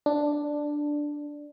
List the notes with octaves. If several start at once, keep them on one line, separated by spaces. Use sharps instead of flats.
D4